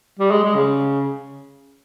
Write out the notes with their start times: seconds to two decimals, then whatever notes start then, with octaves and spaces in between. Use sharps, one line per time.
0.19 G3
0.31 G#3
0.44 G#3
0.55 C#3